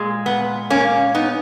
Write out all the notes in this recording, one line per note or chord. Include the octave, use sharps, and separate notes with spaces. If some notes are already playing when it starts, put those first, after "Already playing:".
Already playing: A#2 G#3
B3
A#3 C#4
B3 D#4